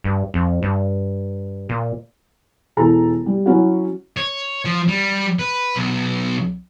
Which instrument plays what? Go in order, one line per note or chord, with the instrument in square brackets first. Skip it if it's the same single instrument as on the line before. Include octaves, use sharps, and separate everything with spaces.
[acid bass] G2
F2
G2
A#2
[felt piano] E1 E3 A4 A#5
G3
F#3 C#4 E4 F#4
[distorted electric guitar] C#5
F3
G3
B4
B1